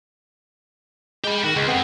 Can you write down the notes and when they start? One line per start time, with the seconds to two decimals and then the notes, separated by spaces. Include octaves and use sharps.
1.24 G#3 G4 B5
1.44 D#3 F#4
1.56 C#2 G#3
1.68 B3 C4 A4